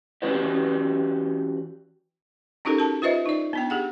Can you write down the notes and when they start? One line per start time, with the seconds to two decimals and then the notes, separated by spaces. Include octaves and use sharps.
0.22 E3 C#4 F#4 G4 B4 D5
2.65 C#4 D#4 F#4 G4 A4 A#4
2.79 A#4 A5
3.02 F4 B4 C5 D#5 E5
3.26 D#4 D5
3.53 B3 D4 G5
3.70 G4 G#4 F#5